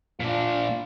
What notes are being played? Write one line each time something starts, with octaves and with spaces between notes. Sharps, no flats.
A#2 D4 F4